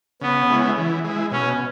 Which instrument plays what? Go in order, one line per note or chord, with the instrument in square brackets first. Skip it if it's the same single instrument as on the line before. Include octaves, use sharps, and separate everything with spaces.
[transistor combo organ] C#3 [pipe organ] B3
[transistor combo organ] G#3 C#4 E4
E3
G#3 E4
[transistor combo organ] B2 [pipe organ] C#4